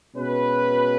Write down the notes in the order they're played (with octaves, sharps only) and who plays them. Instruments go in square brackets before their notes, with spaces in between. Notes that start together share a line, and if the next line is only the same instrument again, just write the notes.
[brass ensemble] B2 G#3 C#4 F#4 B4